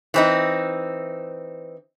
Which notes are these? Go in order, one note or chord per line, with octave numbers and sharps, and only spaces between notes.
E3 C4 D#4